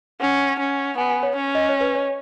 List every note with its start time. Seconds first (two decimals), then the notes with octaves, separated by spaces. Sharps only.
0.20 C#4 F#5
0.59 C#4
0.97 B3 G#5
1.10 G#5
1.23 C#5
1.35 C#4
1.55 D#5
1.69 C#5
1.81 B4
1.95 C#5